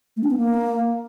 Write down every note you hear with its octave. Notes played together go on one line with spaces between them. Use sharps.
A3
D4
B3
A#3